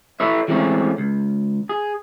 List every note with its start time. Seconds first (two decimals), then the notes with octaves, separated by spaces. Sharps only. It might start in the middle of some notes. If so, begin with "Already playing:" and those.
0.20 E4 A4 B4 C#5 E5
0.48 E3 G#3 A3 C4 C#4
0.98 C#2
1.69 G#4